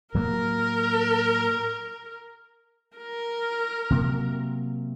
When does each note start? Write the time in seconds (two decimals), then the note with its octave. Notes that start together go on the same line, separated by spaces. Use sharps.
0.14 A2 F#3 A#3 A#4
2.97 A#4
3.90 C3 F#3 A#3